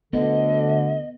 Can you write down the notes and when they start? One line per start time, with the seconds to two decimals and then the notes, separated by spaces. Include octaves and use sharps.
0.13 D2 D3 B3 D#5